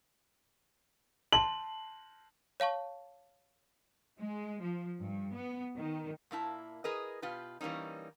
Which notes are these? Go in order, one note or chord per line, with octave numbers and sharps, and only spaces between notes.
A5 C6 F#7
C#5 F5 A5 C#6
G#3
F3
G2
B3
D#3
A#2 A#3 E4 A5
G#4 A#4 B4 D#5
B2 F4 G4 B4
E3 G3 A#3 C#4 D#4